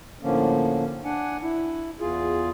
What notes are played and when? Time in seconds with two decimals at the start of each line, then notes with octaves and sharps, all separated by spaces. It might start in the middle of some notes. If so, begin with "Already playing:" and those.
0.22 A2 D3 F3 A#3 C#4
1.05 D4 F#5 G#5
1.43 E4
2.00 E2 F4 G#4